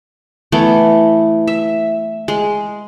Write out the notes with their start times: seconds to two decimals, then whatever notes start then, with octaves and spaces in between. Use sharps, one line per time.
0.52 E3 A3 B3 E4
1.47 E5
2.28 G#3